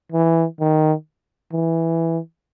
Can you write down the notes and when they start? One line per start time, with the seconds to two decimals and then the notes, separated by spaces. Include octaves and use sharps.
0.12 E3
0.60 D#3
1.53 E3